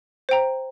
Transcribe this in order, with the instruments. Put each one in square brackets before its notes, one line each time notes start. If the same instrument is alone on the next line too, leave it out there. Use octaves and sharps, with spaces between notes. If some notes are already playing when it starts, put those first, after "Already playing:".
[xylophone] C5 G5 A#5